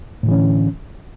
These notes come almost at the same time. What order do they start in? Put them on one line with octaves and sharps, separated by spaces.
A2 D3 E3 C#4